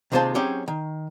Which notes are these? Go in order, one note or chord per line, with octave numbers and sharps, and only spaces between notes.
D#2 C3 G#3 F4 C5 A5
F#3 C4 C#4 D#4 G4 G#4
D#3